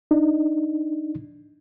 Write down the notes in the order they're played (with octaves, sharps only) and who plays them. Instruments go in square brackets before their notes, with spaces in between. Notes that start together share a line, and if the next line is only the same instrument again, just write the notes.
[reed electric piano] D4 D#4